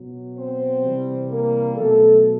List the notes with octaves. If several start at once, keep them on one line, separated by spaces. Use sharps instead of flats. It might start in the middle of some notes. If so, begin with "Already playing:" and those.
Already playing: B2 F#3
C4 C5
C3 E3 G3
A#3 A#4
B2 F#3 A3 A4